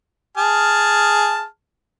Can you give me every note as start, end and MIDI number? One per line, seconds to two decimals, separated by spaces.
0.38 1.45 68
0.38 1.45 81
0.38 1.45 89